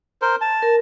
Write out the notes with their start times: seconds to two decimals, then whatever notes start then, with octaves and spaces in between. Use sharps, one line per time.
0.22 A#4 C5
0.41 A5
0.63 A#4